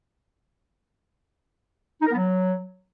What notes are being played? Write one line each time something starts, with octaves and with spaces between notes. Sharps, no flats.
D#4
A#4
B3
F#3